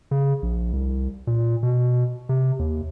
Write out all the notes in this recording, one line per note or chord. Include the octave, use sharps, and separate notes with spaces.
C#3
A#1
C2
A#2
B2
C3
D#2